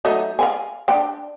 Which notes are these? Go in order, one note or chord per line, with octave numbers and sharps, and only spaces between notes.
F#3 A3 D#4
F5 G5 G#5
D4 G5